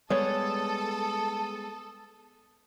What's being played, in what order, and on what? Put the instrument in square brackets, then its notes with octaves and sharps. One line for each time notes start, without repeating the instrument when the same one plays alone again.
[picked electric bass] G3 G#3 B3 [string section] A4 [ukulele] C#5 [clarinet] D#6